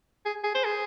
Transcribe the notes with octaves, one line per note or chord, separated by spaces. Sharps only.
G#4
G#4
C5
G#4